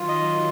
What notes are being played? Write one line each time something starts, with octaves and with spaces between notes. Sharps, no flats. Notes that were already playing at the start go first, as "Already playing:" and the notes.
Already playing: D#3 F#3 F4
D#5